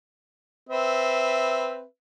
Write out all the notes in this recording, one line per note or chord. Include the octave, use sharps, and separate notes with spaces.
C4 B4 E5